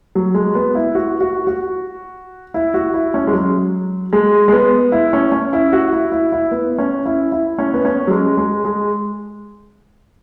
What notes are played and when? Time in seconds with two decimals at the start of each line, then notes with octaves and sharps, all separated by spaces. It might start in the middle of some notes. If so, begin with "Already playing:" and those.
0.15 F#3
0.35 G#3
0.55 B3
0.75 E4
0.95 F#4
1.21 F#4
1.47 F#4
2.54 E4
2.74 F#4
2.94 E4
3.14 C#4
3.27 G#3
3.33 F#3
4.13 G#3
4.48 G#3
4.53 B3
4.92 E4
5.13 C#4
5.32 C#4
5.53 E4
5.73 F#4
5.93 E4
6.12 E4
6.32 E4
6.51 B3
6.79 C#4
7.06 E4
7.32 E4
7.59 C#4
7.74 B3
7.85 C#4
8.07 F#3
8.11 G#3
8.37 G#3
8.65 G#3